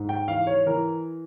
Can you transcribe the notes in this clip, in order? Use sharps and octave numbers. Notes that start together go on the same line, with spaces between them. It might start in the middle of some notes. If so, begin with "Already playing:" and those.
Already playing: G#2
G5
E3 F5
C#5
E3 A#4